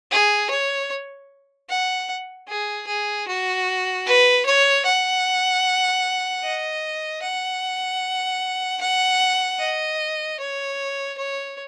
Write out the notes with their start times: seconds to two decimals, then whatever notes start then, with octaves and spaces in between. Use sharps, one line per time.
0.11 G#4
0.50 C#5
1.70 F#5
2.48 G#4
2.87 G#4
3.28 F#4
4.06 B4
4.45 C#5
4.85 F#5
6.44 D#5
7.22 F#5
8.81 F#5
9.59 D#5
10.39 C#5
11.17 C#5